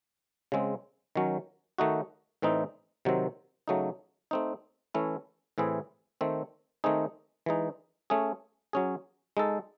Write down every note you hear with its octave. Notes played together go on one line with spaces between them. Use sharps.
C#3 G#3 C4
D#3 F#3 C#4
D#3 A3 D#4 F#4
A2 E3 C4 D#4
C3 D#3 F#3 C4
C#3 F#3 A3 D#4
A3 C4 D#4
E3 A3 C#4 E4
A2 E3 C4 E4 G#4
D#3 A3 C4
D#3 A3 C4 D#4 G#4
E3 G#3 D#4
A3 C#4 G#4
F#3 C#4 G#4
G#3 D#4 A4